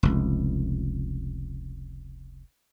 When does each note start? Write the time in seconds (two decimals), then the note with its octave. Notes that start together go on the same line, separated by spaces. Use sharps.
0.03 F1 C#2